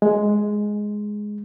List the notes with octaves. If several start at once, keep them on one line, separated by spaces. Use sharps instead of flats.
G#3